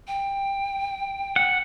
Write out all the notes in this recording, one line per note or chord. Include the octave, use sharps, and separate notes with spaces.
G5
F#5